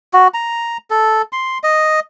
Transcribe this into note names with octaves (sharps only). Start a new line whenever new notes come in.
F#4
A#5
A4
C6
D#5